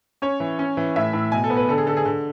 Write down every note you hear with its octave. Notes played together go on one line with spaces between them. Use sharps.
C#4 C#5
E3
C#4
E3
A2 E5
A2
B2 G#5
A4
B3
B4
D3 A4
G#4
D3 A4
G#4
D3